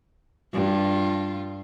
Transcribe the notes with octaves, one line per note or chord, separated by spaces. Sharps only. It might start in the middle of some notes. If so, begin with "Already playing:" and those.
G2 F4